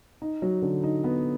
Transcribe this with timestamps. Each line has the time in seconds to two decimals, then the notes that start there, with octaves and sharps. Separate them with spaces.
0.22 D#4
0.42 F#3
0.62 D3
0.83 D#4
1.04 B3